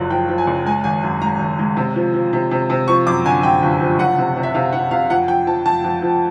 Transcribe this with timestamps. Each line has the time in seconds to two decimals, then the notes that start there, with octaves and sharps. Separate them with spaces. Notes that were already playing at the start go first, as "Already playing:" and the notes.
Already playing: F#1 F#2 F3
0.10 F3 G5
0.29 F3
0.38 G#5
0.47 F#1
0.66 G#3 G#5
0.84 G#1 G#5
1.03 F#2
1.21 G#3 A#5
1.39 G#1
1.59 G#3
1.77 C3
1.96 F3
2.14 F3
2.33 C3
2.51 C3
2.70 C3
2.88 F3 C#6
3.07 F#2 D6
3.25 D3 G#5
3.43 F#2 G5
3.62 G1
3.80 F3
3.99 F#1 F#5
4.18 C3
4.37 C3
4.43 E5
4.54 C3 F5
4.73 C3 F#5
4.91 C3 F5
5.10 F2 F#5
5.28 F2 G5
5.47 F3 A5
5.66 F2 A5
5.84 F2
6.02 F3